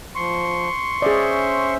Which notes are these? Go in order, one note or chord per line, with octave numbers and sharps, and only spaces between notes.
F3 C6 C#6
C#4 G#4 C5 D5 E5